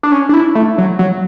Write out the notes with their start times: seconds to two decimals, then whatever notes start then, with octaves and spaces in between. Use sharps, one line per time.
0.03 D4
0.12 C#4
0.29 D4
0.33 E4
0.55 A3
0.78 F#3
0.99 F#3